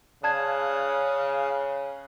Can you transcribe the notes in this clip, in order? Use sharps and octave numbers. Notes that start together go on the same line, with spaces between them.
C#3 D5 F5 A5 D#6 F#6 G#6